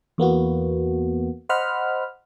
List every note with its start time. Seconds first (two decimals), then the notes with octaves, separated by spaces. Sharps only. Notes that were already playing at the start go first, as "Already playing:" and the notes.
0.18 E2 A#3 B3 F#4
1.49 C5 D#5 F#5 B5 F6